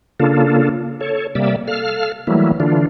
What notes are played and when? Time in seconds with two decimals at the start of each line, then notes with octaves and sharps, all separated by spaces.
0.20 C#3 A#3 D4 F4 A4
1.01 A4 C#5
1.35 C3 G3 A#3 D5 E5
1.67 A4 F5 F6
2.27 E3 F#3 G3 A3 A#3 E4
2.60 D3 E3 D4 F4